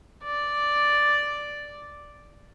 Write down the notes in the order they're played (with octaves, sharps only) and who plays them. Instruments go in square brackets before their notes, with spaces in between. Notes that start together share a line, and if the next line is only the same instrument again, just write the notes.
[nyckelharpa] D5